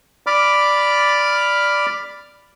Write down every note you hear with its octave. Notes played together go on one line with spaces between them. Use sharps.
D5 B5 D6 F6